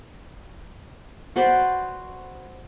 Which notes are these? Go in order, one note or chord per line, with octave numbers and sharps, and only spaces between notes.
F#4 B4 C5 D5